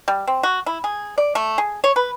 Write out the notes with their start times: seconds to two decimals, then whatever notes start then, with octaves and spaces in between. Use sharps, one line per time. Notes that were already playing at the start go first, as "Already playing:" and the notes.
0.08 G3
0.27 C4
0.43 F#4
0.66 E4
0.84 G#4
1.18 D5
1.35 A3
1.58 G#4
1.84 C#5
1.96 B4